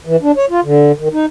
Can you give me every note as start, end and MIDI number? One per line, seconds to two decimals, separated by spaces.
0.06 0.16 52
0.22 0.32 62
0.37 0.46 73
0.50 0.60 65
0.64 0.92 50
0.99 1.08 51
1.13 1.26 63